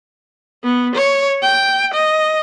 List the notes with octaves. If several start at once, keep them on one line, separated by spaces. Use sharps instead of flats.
B3
C#5
G5
D#5